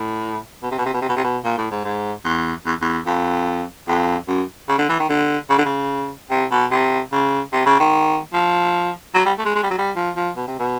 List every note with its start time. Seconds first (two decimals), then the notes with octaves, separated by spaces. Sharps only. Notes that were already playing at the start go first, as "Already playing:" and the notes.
Already playing: A2
0.63 B2
0.71 C3
0.78 B2
0.86 C3
0.94 B2
1.02 C3
1.09 B2
1.17 C3
1.24 B2
1.44 A#2
1.58 A2
1.71 G#2
1.85 G#2
2.25 E2
2.66 E2
2.82 E2
3.06 F2
3.88 F2
4.28 F#2
4.69 C#3
4.78 D3
4.89 E3
5.00 D#3
5.09 D3
5.50 C#3
5.58 D3
5.65 C#3
6.31 C3
6.51 B2
6.71 C3
7.12 C#3
7.53 C3
7.66 C#3
7.80 D#3
8.33 F3
9.15 F#3
9.25 G3
9.39 A3
9.45 G#3
9.55 G#3
9.63 G3
9.70 F#3
9.78 G3
9.96 F3
10.16 F3
10.36 B2
10.48 C3
10.59 B2